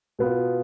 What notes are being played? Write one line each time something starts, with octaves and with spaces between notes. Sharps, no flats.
B2 B3 F4